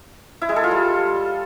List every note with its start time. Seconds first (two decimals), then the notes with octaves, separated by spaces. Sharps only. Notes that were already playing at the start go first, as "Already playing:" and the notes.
0.42 E4
0.49 G#3
0.56 A4
0.64 F4
0.71 G3